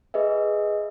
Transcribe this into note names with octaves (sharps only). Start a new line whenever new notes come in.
G#4 B4 D#5 E5